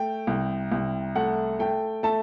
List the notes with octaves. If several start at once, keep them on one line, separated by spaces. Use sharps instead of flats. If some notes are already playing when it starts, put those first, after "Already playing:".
Already playing: A3 G5
C2
C2
A3 F#5
A3 G5
A3 A5